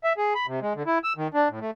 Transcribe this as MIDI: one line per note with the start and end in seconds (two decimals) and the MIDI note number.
0.04 0.13 76
0.17 0.34 68
0.35 0.46 83
0.47 0.60 48
0.61 0.73 56
0.75 0.83 50
0.87 0.98 64
1.04 1.13 88
1.17 1.28 51
1.34 1.48 62
1.49 1.59 45
1.61 1.71 57